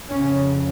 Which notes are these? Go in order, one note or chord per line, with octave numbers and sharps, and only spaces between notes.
F2 C#3 C#4